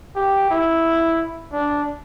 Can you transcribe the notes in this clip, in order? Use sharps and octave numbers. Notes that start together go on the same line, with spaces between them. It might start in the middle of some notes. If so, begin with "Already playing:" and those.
G4
E4
D4